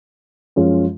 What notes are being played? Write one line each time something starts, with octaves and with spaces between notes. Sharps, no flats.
F#2 F3 G#3 C#4 F4